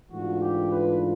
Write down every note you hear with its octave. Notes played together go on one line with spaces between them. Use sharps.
G#2 E3 A3 D4 F4 F#4
G4
B4